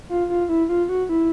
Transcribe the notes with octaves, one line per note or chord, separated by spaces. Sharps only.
F4
F4
E4
F4
F#4
E4